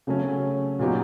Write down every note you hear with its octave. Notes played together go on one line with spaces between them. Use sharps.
C#3 F#3 A3 C#4
A#2 F#3 B3 D#4 G4